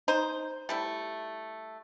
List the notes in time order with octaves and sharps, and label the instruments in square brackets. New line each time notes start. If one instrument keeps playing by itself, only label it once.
[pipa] D#4 C5
G3 A3 E4